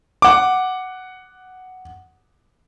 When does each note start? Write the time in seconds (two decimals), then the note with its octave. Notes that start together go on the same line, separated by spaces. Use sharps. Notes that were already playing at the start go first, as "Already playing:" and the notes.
0.22 F#5 D6